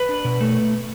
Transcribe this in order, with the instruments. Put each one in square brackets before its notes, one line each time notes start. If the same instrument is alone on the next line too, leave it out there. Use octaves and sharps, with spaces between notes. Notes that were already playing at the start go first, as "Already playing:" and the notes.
Already playing: [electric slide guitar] B4
D4
B2
A3